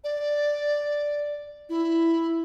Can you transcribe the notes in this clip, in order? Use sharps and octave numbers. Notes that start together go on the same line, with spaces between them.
D5
E4